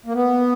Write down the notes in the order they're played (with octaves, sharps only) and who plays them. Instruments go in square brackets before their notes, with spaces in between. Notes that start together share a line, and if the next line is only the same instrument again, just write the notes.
[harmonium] A#3
B3